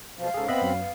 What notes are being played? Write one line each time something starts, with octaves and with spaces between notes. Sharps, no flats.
F2 B2 F3 F5
G#2 C#3 G#4 A4
B3 C4 B4 D#5 E5 B5
F#2 F#3
B3